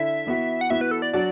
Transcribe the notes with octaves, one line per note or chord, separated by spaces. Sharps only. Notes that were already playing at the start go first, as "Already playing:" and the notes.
Already playing: D3 E4 E5
E3 B3 F#4
F#5
E3 B3 F#4 E5
B4
A4
D5
F#3 D4 F#4 D5